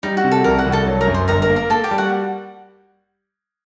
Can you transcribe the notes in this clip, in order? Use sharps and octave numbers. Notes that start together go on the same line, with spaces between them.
G3 D#4
F#4
C3
A4
C2 A#4
F#4 F#5
C2
A4 A5
F#3
A#4 A#5
F#2
C5 C6
G1 A#4 A#5
A#4 A#5
A#3
A#4 A#5
A#3 A4 A5
G4 G5
G3
F#4 F#5